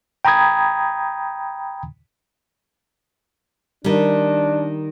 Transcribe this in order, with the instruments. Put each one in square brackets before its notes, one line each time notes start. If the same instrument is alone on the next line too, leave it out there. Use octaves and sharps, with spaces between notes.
[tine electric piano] G5 A#5 B5 D#6 G#6
[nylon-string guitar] D#3 G3 [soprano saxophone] D4